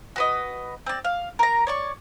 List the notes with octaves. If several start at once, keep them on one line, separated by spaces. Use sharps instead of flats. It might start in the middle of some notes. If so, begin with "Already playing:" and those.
F#4 B4 D#5
C4 D5
F5
A#4 A#5
C#5 D5 C#6